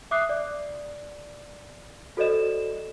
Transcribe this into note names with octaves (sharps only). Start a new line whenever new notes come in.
E5 D6 D#6 F#6 C7
D5
F#4 A4 C5 D5 D#5 E7